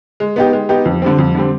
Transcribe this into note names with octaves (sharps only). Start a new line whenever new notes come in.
G#3
B3 D#4 G4
G#3
B3 D#4 G4
F2
D3 G3 C4
F2
D3 G3 C4